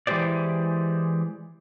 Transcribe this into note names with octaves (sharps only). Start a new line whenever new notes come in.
E3 G#3 D#4 G4 C5 D5